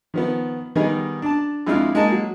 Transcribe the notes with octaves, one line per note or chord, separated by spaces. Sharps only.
D#3 F3 B3
D#3 G3 B3 D#4 G#4
D4 A5
F2 G#3 D4 E4 F4 F5
G#3 A#3 D#4 A5
F#3